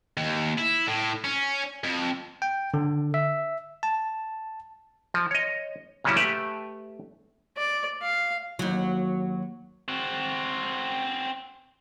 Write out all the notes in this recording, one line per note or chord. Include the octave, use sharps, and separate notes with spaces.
D#2
E4
A2
C#4
F2
G5
D3
E5
A5
F3
C#5 D#5
A#2 C#3 F#3 G3 C#4 E4
A3 G4 B4 E5
D5
F5
D#2 F#3
C4 F#4